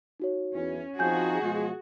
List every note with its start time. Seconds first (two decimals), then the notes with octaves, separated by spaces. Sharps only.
0.20 D#4 F#4 C#5
0.54 E2 E3 C#4
0.99 F3 C4 D#4 F#4 G#4 G#5 G6
1.42 B2 F3 G#3